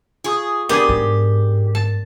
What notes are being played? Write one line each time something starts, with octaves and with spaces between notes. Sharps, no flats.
F4 G#4 C#6 D#6
B3 D4 G4 G#4 A#4
G#2
A5